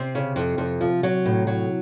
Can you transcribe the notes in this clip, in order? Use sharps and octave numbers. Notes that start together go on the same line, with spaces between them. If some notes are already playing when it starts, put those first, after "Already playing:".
Already playing: C3 C4
C#3
F2
F2
F3
F#3
A2
F#3